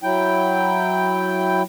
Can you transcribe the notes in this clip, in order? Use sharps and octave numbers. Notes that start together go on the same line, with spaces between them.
F#3 E4 G5